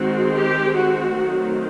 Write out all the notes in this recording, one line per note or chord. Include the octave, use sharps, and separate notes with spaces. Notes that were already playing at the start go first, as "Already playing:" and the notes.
Already playing: D#3 G#3 C4 F#4
G4
F#4
D#3 F#3 A3 C4